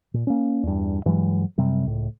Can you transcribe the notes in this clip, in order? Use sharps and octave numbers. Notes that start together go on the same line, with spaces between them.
A#2
A#3 C#4
E2 G2
G2 E3 F#3 G#3
F#2 C3 G3
C#2 A2